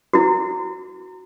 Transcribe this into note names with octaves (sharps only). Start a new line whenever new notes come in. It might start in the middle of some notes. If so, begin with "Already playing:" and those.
E4 F#4